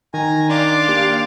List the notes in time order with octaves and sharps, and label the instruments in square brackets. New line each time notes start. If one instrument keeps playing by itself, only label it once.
[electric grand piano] D#3 [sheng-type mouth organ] G#5 A#5
[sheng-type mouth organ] D4 A5 C6 [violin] F5 D6
[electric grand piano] A#3 G4